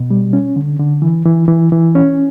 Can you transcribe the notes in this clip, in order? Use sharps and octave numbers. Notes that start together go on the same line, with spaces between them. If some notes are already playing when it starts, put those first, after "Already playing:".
Already playing: B2
G3
C#4
D3
D3
E3
E3
E3
E3
C#4